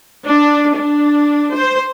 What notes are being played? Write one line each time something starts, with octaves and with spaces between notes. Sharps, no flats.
D4
D4
C5